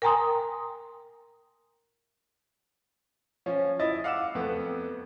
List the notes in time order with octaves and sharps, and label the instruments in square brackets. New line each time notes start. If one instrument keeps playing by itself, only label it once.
[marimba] A#4 G5 G#5 A#5 C6 D#6
[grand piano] F3 C#4
E4 D#5 A6
F5 F#5 D6 E6 E7
F2 A3 B3